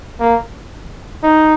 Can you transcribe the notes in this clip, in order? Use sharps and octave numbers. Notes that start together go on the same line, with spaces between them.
A#3
D#4